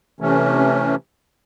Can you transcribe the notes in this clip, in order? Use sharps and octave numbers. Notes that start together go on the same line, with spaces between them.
C3 E3 A3 C#4